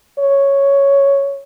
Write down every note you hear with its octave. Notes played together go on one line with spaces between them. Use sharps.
C#5